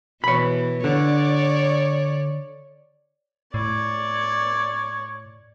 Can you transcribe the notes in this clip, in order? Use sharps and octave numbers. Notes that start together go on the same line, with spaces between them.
B2 E3 C#5 B5
D3 C#5 D5
A2 C#5 D5